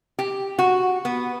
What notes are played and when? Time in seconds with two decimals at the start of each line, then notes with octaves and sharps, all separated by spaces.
0.19 G4
0.59 F#4
1.05 B3